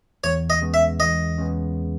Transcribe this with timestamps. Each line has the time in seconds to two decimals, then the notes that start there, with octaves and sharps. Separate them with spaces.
0.24 E2 C#5
0.50 D#5
0.62 C#3 G#3 B3
0.74 E5
1.00 E2 D#5
1.38 C#3 G#3 B3